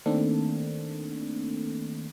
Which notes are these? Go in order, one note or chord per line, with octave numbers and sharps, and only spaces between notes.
D#3 A3 A#3 C4 D4 A4